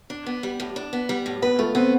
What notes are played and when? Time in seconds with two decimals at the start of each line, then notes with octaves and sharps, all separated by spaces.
0.10 D4
0.26 B3
0.43 G3
0.60 A2
0.76 D4
0.93 B3
1.09 G3
1.26 A2
1.42 B3 B4
1.59 A3 F4
1.75 B3 C4